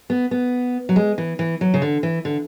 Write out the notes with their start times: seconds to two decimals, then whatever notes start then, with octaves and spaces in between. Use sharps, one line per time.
0.10 B3
0.31 B3
0.89 F#3
0.96 G#3
1.18 E3
1.39 E3
1.61 F#3
1.74 C#3
1.82 D3
2.03 E3
2.25 D3